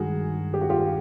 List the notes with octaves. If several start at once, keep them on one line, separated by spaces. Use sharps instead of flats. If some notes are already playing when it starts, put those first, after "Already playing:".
Already playing: G2 D#3 G#3 F#4 G#4
G4
F#4
F4 G4